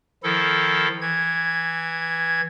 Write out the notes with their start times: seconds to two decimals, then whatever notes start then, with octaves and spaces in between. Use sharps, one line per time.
0.23 D#3 F3 E4 A4
1.01 E3 G#6